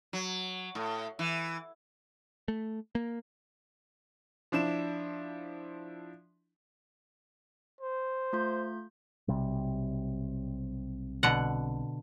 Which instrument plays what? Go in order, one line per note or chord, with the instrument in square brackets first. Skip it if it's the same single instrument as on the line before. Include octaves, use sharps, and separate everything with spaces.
[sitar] F#3
A2
E3
[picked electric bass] A3
A#3
[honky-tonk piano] F3 D4 E4 E7
[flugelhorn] C5
[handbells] A3 F4 G6
[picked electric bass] B1 C3 G3
[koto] B2 D3 F#5